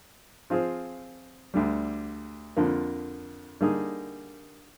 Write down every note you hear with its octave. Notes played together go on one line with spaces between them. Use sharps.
F3 C4 F4 G#4 C5
D2 D3 G3
F2 D3 F3 A#3
D3 G3 A#3 D#4 G#4